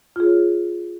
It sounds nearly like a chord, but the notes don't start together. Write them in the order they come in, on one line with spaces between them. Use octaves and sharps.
F4 G#4 C#5